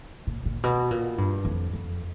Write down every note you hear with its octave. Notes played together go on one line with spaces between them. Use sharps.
A#2
A#2
B2
A#2
G2
F2
F2